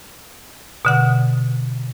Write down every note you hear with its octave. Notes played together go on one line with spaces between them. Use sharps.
B2 D3 F#5